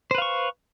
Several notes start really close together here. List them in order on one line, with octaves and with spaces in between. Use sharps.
C5 B4 F5 C#6